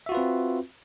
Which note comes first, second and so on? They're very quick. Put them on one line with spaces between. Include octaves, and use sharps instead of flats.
E5 F#4 F4 B4 C4